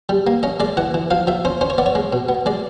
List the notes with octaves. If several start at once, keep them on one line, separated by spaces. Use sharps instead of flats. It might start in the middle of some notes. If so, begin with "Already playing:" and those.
G3
A#3
C#4 D#5
G#3 D5
E3 F#5
E3
F3 F5
F3 E5
C#4 C5
C#4 C5
C#5
B3 D5
C#5
G#3
B2
B3
G#3 D5